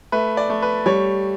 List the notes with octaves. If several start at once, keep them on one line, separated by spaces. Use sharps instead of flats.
A3 B4
D5
A3
B4
G3 C#5